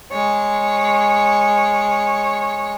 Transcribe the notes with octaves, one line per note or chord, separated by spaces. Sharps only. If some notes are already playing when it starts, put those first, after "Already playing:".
G#3 C#5